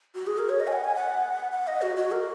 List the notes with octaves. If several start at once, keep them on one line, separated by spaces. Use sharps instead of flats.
F#4
G#4
A#4
C#5
D#5
G#5
F#5
G#5
F#5
F#5
D#5
F#4
F#4
A#4